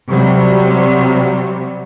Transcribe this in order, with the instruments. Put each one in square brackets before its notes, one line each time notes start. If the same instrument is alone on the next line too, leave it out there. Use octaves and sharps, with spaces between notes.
[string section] C3 F#3 G3